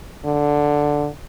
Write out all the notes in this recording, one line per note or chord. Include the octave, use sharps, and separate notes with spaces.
D3